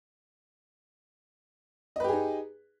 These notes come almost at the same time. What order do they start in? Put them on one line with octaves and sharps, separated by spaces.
D#5 B4 G4 G#4 D#4